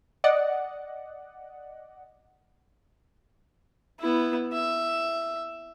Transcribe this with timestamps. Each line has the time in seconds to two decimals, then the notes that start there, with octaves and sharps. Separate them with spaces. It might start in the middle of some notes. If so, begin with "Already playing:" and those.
0.24 D5 D#5 F#5
4.00 B3 E4
4.53 E5